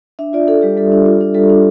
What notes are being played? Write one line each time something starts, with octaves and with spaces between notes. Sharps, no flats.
D4 E5
F4 D5
D4 A4
G3 G4
G3 A4
D4
F4
D4
G3 A4
D4